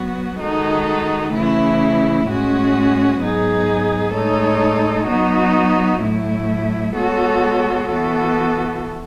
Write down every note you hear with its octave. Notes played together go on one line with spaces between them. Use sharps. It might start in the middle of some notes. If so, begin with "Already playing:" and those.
Already playing: F#3 B3 F#4
D#3 G#3 D#4 F#4 A4
C#3 E3 A3 E4
A2 G#3 C#4 F#4
G#2 F#3 B3 D#4 G#4
A2 G#3 D#4 A4 C#5
F#3 B3 D#4 F#4
A2 F#3 A3 E4
G#3 B3 F#4 A4 C#5
E3 B3 F#4 A4